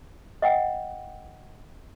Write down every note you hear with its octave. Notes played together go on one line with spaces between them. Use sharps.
D#5 F#5 G5